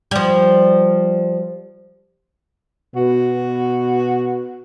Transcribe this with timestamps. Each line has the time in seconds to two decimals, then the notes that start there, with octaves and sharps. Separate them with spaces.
0.11 F3 G3
2.96 B2 F#4